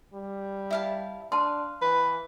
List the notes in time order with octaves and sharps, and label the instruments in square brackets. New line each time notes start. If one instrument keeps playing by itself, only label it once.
[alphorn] G3
[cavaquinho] E4 F5 A5
[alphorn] D4 [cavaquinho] F5 [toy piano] A5 C6
[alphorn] E3 [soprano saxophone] B4